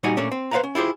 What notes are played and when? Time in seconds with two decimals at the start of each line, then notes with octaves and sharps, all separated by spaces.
0.03 A#2 G3 D#4 F#4 D#5 G#5
0.17 A#2 A3 A#3 C#4 D4
0.32 C4
0.51 B4 C5 D#5 F5 F#5 A#5
0.63 C#4
0.75 E4 F4 G4 G#4 C5